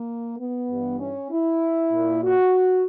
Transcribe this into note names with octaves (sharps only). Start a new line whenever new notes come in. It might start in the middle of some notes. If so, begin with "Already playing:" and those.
Already playing: A#3
B3
G2 E3
C#4
E4
A#2
F#4